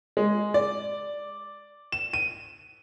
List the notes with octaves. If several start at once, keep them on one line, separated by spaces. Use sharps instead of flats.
G#3
D5
E7
D#7